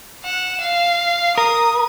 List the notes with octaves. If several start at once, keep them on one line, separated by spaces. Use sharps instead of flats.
F#5 E7
F5
A#4 D#6